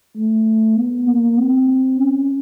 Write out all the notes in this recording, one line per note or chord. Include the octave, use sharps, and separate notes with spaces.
A3
B3
A#3
C4
C#4